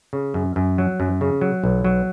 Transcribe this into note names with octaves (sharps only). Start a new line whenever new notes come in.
C#3
F#2
F#2
F#3
F#2
C#3
F#3
B1
F#3